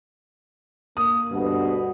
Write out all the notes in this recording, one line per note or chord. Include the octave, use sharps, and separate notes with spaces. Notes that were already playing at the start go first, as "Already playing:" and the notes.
A#3 D#6
D2 G2 B2 B3